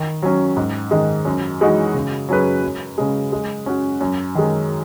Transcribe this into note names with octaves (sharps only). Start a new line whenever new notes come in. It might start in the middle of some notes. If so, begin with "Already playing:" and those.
Already playing: D#3
F#3 C#4
G#2
D#3 G#3 D#4
F#2
E3 G#3 D#4 F#4
C#3
F#3 C#4 G#4 B4
F#2
C#3 G#3
G#3
C#4 F#4
F#2
D#3 G#3